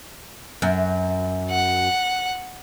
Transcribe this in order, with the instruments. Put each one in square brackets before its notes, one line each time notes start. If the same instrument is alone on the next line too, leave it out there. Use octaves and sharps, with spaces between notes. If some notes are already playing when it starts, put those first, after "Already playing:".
[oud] F#2
[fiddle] F#5